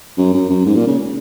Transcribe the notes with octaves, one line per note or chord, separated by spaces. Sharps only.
F#2
F#2
F#2
G#2
A#2
C#3